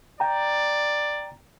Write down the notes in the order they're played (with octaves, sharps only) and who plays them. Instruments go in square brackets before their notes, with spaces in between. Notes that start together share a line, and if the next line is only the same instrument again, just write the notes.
[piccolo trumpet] D5 [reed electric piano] G5 A#5